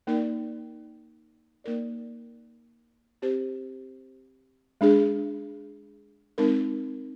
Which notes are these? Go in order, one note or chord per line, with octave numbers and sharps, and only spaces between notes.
A#3 D#4 A#4 D5
A#3 D#4 A#4 D5
C4 G4 C5
G#3 D4 G#4
G#3 C4 D#4 A#4